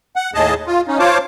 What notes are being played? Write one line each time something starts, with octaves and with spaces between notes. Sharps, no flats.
F#5
D#2 A2 G#4 D#5 A5
F4
C#4 D#4
F4 C5 C#5 F5 A5 D6